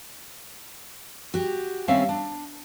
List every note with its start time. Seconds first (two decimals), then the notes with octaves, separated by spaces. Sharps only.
1.34 F#4 G4
1.88 D#2 G3 C4 C#4 E5 F5
2.09 D4